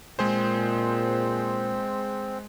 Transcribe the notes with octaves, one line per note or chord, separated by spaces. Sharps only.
A#2 G#3 C4 G#4 C5